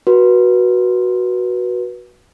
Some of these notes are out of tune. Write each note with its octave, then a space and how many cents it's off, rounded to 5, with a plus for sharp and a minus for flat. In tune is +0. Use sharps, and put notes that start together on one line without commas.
F#4 +0 B4 -25